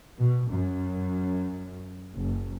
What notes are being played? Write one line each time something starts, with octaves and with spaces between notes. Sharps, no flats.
B2
F#2
F#1